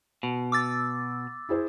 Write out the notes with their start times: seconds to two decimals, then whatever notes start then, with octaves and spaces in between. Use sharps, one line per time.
0.23 B2
0.52 D6 E6 A6
1.49 E4 G#4 C5